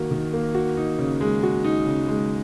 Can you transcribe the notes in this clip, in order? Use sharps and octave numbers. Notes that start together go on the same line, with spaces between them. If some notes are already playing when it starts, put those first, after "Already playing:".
Already playing: D#3 A#3 F#4 A#4
D#3
A#3
F#4
D#4
C#3
G#3
F#4
D#4
C#3
G#3